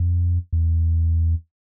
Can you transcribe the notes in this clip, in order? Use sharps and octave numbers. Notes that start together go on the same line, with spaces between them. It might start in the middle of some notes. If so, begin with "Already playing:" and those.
Already playing: F2
E2